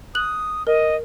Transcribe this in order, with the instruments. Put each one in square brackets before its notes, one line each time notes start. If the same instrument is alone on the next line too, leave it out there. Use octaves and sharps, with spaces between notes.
[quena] D#6 [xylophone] F#6 F#7
[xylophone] A#4 [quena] D#5